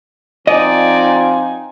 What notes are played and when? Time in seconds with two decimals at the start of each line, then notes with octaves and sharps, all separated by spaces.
0.47 F3 C4 D#4 F4 D5 D#5 G#5